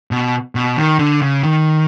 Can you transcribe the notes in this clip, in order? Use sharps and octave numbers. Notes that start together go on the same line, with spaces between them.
B2
B2
D#3
D3
C#3
D#3